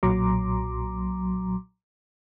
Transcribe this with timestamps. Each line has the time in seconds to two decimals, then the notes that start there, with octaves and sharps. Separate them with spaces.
0.03 B1 A#2 F#3 A#5 C6 D6